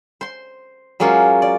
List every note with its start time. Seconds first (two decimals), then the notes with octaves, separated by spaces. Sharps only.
0.21 C5 C6
1.00 F#3 G#3 A#3 C#4 F4
1.42 D5